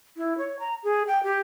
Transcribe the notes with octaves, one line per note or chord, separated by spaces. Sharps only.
E4
C#5
A#5
G#4
G5
G4